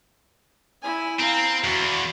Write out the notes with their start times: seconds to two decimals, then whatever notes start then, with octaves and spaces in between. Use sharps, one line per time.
0.82 E4 G#5
1.20 C4 F5 A#5
1.64 E2 F#4